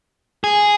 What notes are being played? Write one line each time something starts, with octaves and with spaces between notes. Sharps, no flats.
G#4